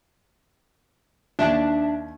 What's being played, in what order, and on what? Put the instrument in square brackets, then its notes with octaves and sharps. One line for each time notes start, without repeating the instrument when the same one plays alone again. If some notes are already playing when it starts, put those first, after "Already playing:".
[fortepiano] D#2 [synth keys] D4 [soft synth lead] E5